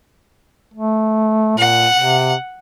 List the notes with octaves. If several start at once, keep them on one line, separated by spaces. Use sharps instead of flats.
A3
A#2 F#5
C3